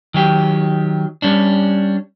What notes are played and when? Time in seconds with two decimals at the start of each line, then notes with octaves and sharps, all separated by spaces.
0.14 D#3 F#3 G4
1.22 G3 C#4 D4